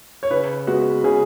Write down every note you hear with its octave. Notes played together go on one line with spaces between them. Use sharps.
C#5
C#3 B4
G#3 B3 F#4
C#3 G#4